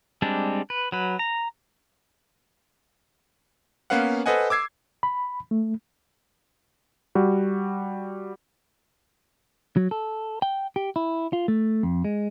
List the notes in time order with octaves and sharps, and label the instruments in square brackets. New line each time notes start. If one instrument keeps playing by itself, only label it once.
[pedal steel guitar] G3 G#3 C4 D4
B4
F#3 B4
A#5
[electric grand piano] A#3 B3 C#4 B4 F5 F#5
A4 B4 C5 D#5 F#5 G#5
D6 E6 G#6 C7
[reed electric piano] B5
A3
[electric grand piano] G3 F#4
[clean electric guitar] F#3
A4
G5
G4
E4
F4
A3
F2
G#3